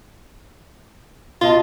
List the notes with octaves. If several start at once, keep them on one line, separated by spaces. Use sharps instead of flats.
B2 F4 D#5 A5